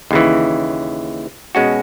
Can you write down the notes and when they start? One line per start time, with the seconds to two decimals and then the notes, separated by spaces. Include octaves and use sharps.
0.11 D#2 C#3 E3
1.55 B2 G#3 C#4 F#4